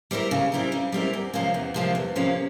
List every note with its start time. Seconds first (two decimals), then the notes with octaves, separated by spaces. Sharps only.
0.11 G3 C4 E4 A#4
0.31 C#3
0.52 G3 C4 E4 A#4
0.72 C#3
0.92 G3 C4 E4 A#4
1.13 E2
1.34 C3 F3 A#3 C#4
1.54 E2
1.74 C3 F3 A#3 C#4
1.95 E2
2.16 C3 F3 A#3 C#4